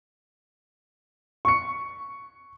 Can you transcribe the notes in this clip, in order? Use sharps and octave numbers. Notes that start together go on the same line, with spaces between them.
C#6 C#7